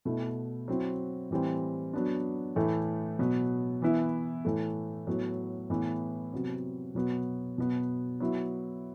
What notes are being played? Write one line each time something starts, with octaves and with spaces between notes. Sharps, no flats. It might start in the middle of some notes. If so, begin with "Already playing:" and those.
B2 A3 E4
F#3 C4 E4
A2 E3 G3 C4
F#3 B3 D4
A2 E3 A3 E4
B2 F#3 B3
E3 B3 E4
A2 E3 A3
A2 F#3 B3
A2 E3 B3 E4
C3 F#3 B3
B2 F#3 B3
B2 F#3 B3
F#3 B3 E4